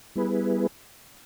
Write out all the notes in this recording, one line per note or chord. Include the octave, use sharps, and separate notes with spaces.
G3 B3 E4 G#4 B4